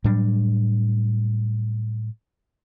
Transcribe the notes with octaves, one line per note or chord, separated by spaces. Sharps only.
A2 F#3 G3 D4